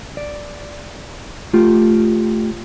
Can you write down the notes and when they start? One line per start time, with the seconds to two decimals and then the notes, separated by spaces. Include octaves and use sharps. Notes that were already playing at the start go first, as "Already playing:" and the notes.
0.17 D5
1.53 A3 F4 G4